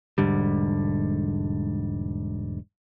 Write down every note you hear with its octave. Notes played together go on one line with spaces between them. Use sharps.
E1 G#2 D3 G3